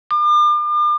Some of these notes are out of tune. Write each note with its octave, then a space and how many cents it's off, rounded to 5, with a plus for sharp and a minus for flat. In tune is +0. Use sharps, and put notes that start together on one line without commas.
D6 +40